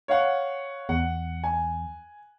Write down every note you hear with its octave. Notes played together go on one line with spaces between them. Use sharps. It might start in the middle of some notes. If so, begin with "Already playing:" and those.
C#5 F5 F#5
E2 F#5
G#5